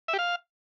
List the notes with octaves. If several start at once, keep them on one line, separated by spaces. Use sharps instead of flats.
E5
G4
F5